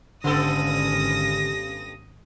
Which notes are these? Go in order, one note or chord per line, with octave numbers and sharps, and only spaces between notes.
G#1 G2 D3 B3 C#4 A4 D#6 A#6